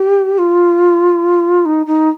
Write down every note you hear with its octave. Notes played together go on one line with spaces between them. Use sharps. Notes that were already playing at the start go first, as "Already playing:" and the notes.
Already playing: G4
F4
D#4
D#4